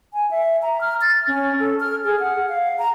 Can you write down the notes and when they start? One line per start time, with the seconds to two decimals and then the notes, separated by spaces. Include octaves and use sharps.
0.13 G#5
0.31 E5
0.62 A#5
0.81 F6
1.02 A6
1.27 C#4
1.60 A4
1.80 F6
2.05 G#4
2.20 F#5
2.49 F5
2.79 A#5